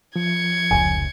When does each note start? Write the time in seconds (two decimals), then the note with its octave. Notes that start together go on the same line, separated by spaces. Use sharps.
0.16 F3 G#6 C#7
0.71 F1 C#2 G#5